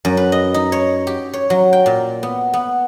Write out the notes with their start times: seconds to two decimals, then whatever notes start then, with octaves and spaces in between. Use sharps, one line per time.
0.05 F#2
0.17 B4
0.32 D#5
0.54 D#4
0.72 C#5
1.07 G4
1.34 C#5
1.50 F#3
1.73 G5
1.86 A#2
2.23 B3
2.54 B3